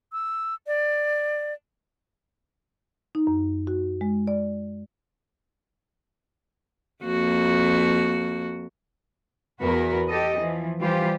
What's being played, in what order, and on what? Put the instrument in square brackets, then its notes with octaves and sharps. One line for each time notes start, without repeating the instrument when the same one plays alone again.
[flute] E6
D5
[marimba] D#4
F#2
F#4
G#3
D5
[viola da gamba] F2 A#3 F#4
[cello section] E2 F#4 A#4 B4
G4 A4 D#5
E3 F3
E3 G3 F4 G4 C5